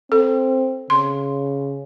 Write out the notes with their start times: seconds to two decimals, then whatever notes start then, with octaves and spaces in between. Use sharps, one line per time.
0.12 C4 A4
0.90 C#3 C6